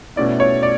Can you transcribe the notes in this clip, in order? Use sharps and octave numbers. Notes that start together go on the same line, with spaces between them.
B2 A3 C#4 E4 D5
C#5
D5